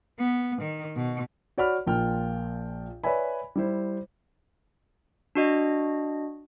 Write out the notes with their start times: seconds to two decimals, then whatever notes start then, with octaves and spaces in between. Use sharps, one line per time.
0.19 B3
0.62 D#3
0.95 B2
1.58 F#4 C#5 D5 F#5 B5 F6
1.87 A#1 A#2 F4 G5 F6
3.04 B4 C#5 D5 E5 G#5 B5
3.56 G3 E4 C5
5.35 D4 F#4 D#5